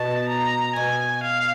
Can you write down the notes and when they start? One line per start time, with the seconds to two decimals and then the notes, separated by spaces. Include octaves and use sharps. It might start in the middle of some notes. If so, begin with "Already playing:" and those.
Already playing: B2 A5
0.29 A#5
0.76 B2 G#5
1.23 F5